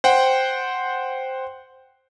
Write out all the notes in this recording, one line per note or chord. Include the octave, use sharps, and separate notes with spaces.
C5 F#5 G5